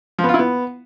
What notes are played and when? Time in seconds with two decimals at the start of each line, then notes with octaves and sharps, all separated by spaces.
0.19 F3
0.24 B3
0.29 F4
0.34 E4
0.39 B3